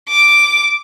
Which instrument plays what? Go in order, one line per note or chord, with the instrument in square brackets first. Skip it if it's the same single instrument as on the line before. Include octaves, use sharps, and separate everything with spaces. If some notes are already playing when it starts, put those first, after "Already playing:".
[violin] D6